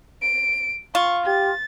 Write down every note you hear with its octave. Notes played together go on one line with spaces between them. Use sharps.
D7
F4 C#6
G4 A6